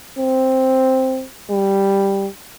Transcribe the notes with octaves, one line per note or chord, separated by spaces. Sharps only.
C4
G3